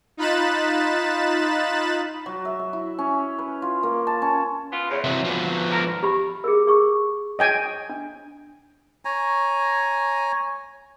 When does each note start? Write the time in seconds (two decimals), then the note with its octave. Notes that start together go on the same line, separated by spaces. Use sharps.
0.17 D#4 F4 B5 F#6 A6 E7
2.26 F#3
2.45 E5
2.59 E5
2.73 E4
2.99 C#4
3.39 B4
3.62 F4
3.83 A#3
4.07 A5
4.22 C#4
4.72 B3 F4
4.90 E2 C#3
5.04 C3 E3 F#3
5.25 F3 B3
5.71 D3 A4 A#4
6.03 G4 B5
6.44 G#4 A#4
6.67 G#4 C#6
7.39 D#5 G5 G#5
7.89 D4
9.05 C#5 G#5 A#5